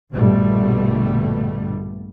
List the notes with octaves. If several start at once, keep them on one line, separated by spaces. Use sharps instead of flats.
A#1 G2 B2 D3 G3 A3